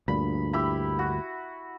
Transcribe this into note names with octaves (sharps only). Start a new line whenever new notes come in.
D2 G2 A#2 B5
E4 G4 B5
F#4